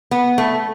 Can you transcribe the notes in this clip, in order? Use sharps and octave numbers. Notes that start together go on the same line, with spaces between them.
B3
A3